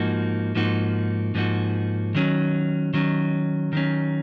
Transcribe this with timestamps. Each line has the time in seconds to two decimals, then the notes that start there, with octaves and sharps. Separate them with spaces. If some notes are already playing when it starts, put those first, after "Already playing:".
Already playing: G#2 F3 A#3 D#4 F#4
0.55 G#2 F3 A#3 D#4 F#4
1.35 G#2 F3 A#3 D#4 F#4
2.15 D#3 F#3 C#4
2.93 D#3 F#3 C#4
3.73 D#3 F#3 C#4